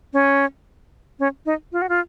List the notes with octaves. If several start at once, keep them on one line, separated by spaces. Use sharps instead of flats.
C#4
C#4
D#4
F4
F#4
F4